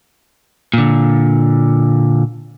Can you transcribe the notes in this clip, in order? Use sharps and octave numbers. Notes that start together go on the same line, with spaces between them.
A#2 D3